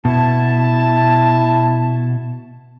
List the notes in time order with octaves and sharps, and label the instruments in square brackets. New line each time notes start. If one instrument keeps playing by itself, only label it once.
[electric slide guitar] B2 [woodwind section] E4 A5